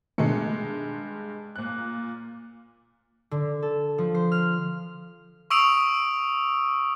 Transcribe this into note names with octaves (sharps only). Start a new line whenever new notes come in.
G2 B2 D#3 G#3 A3 C#7
A#2 F#6
D3
A4
F3
C5
F6
C#6 D#6 E6 D7 F7